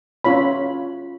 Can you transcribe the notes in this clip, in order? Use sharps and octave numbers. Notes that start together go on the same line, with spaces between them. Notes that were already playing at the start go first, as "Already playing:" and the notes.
C#4 F4 C#5 B5